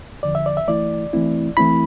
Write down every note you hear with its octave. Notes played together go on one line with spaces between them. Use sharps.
E2 D3 F3 D5
E5
D5
E5
E3 A3 E4 D5
E3 A3 C4 E4
E3 A3 C4 E4 B5